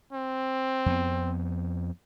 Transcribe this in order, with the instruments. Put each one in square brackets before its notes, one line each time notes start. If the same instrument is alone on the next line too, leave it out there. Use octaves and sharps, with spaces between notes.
[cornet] C4
[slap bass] F2 B3